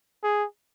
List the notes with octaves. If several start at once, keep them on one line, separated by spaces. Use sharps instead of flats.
G#4